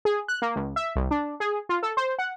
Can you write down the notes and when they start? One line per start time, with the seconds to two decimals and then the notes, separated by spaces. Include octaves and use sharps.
0.05 G#4
0.28 F#6
0.42 A#3
0.56 C#2
0.76 E5
0.96 C2
1.11 D4
1.40 G#4
1.69 F4
1.83 A4
1.97 C5
2.19 F#5